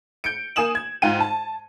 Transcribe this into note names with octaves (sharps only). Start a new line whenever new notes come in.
G6 C#7 D7
A#3 G#5 D#6 E7 F#7
G#6
G#2 F4 G5 D#7
A5